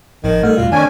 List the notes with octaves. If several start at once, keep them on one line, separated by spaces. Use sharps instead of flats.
G#1 A2 D#3 F3
G3 A3 A4 F6
F2 B2 G3 F4
F2 D#3 C#4 D4 G#5